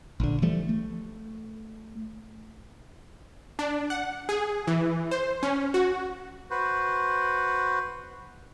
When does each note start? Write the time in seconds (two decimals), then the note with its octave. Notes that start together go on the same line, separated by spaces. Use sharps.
0.20 A#1 D3
0.42 E3 F3 G3 A3
0.69 A3
3.59 D4
3.90 F#5
4.29 G#4
4.67 E3
5.11 C5
5.43 C#4
5.74 F#4
6.51 F#4 B4 C5